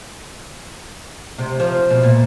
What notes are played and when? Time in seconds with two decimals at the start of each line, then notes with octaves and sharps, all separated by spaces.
1.38 C3
1.60 F3
1.90 B2
2.03 A#2